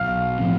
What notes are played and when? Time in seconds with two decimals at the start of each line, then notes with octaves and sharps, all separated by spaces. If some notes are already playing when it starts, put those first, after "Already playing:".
Already playing: B1 F5 F6
0.39 A2 F3 C4